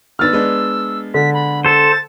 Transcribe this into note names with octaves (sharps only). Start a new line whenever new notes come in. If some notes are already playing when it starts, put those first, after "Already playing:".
D#3 B3 D4 E6 F6 A6
G#3 B3 D4
D3 B6
B5
A4 C5 A6